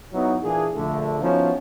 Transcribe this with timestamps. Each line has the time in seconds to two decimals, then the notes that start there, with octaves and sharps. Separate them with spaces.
0.13 F#3 B3 D#4 E4
0.43 A#2 E3 D4 G#4
0.74 A#1 D3 A3
1.20 F3 B3 C#4 D#4 E4 F#4